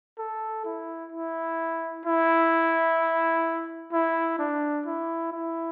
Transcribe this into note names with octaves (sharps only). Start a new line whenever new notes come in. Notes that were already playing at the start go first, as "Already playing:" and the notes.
A4
E4
E4
E4
E4
D4
E4
E4